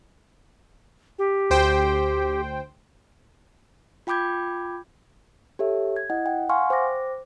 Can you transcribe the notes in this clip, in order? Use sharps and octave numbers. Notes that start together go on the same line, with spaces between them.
G4
D2 C5 G5
F4 G5 B5 D6 G6 G#6
G4 A4 C#5 E5
G#6
E4 D#5 F#5
F#5 G5
F5 F#5 G#5 C6 C#6 F6
C5 G5 D6 A#6